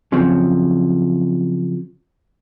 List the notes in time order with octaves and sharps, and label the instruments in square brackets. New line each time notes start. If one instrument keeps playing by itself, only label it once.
[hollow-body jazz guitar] C#3 F3 F#3 C4